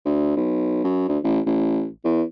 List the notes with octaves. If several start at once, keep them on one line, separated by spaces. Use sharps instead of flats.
D2
B1
F#2
D2
A1
A1
E2